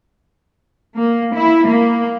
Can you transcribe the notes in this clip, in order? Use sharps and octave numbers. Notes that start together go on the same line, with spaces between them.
A#3
E4
A#3